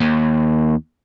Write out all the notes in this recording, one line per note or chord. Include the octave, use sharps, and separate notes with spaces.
D#2